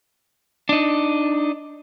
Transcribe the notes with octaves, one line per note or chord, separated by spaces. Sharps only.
D4 D#4